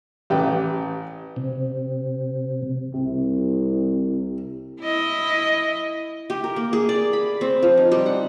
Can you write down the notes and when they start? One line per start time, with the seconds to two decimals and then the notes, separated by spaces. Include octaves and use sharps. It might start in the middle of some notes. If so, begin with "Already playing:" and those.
0.30 A1 G4 B4 G5
1.36 C3
2.94 C2 C3
4.82 E4 D#5
6.30 G4
6.44 A#4
6.56 A#3
6.73 G#4
6.89 D5
7.13 B5
7.41 C4
7.62 F3
7.77 D#4
7.92 G3
8.06 F#5